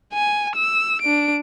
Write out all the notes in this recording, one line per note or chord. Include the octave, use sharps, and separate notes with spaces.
G#5
E6
D4 D7